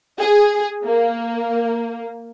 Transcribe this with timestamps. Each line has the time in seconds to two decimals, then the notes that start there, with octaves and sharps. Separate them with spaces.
0.19 G#4
0.85 A#3